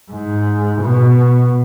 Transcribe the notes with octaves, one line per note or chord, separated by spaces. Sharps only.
G#2
B2